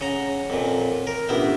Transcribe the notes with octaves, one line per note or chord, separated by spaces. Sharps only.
C#3 C#5 F#5 A#5
F2 A#2
A#4
A1 B3 D4 E4 F4 G4